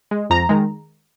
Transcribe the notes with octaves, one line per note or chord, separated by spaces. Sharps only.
G#3
F2 A#5
D#3 G#3